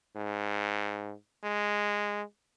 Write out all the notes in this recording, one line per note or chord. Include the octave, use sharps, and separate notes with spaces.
G#2
G#3